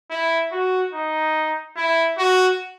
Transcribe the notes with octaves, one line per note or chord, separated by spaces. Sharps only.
E4
F#4
D#4
E4
F#4